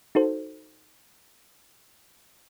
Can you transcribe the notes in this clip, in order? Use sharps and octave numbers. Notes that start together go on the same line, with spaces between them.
D#4 F#4 A4 C5